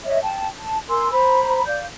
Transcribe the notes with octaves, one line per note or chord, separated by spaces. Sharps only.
C#5 D#5 E5
G5 A5
A5
A#4 G#5 C6 E6
C5 A#5 B5
D5 F5 G6